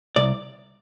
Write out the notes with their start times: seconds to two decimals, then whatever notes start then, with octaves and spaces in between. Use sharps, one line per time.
0.16 C2 D5